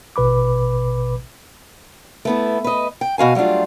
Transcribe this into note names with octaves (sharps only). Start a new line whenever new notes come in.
A1 B2 B4 B5 D6
A3 B3 E4
B4 D#5
G5
B2 F#4 F5 G#5
F#3 G3 A3 D4 F4